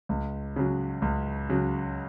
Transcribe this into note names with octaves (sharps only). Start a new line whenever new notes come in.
C#2
C#3 F#3
C#2
C#3 F#3